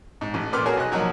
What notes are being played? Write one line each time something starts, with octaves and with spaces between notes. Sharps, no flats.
G#2
A1
A#2 A4 B4 C6 D6 F6
F#4 G#4 A#4 C#5 G#5
B1 D#5 F#6
F3 F#3 A#3 D#4